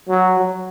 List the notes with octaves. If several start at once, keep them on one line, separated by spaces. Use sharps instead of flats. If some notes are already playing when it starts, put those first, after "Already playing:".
F#3
F#3